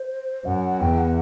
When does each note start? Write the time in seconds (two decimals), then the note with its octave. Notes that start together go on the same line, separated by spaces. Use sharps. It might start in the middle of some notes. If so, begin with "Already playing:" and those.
Already playing: C5
0.45 F#2 F#5
0.80 E2 G5
0.98 F#5